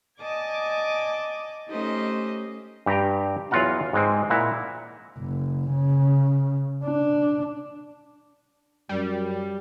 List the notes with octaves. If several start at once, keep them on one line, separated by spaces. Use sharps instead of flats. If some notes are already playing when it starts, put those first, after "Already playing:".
D5 D#5 G#5 A5 D6
A3 C#4 D#4 G4 C5 D#5
G2 G4 G5 A#5
E2 F#3 F4 F5 F#5 A#5
G#2 G#3 C4
A#2 E4 F#5 A#5
F#1
C#3
D4
F#2 G3